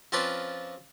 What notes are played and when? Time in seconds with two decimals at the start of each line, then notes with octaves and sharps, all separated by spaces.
0.12 F3 C4 C#4 F4 B4 D5